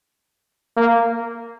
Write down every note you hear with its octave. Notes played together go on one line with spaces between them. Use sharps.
A#3